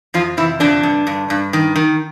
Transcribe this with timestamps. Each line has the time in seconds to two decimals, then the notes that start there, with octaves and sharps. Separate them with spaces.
0.14 F2 F3 F4
0.37 C3 E3 E4
0.60 F2 D3 D4
0.83 G2
1.07 G2
1.30 G2
1.53 D#3
1.76 D#3